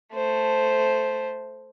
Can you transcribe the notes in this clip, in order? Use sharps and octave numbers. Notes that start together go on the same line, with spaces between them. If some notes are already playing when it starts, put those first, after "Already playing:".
A3 C5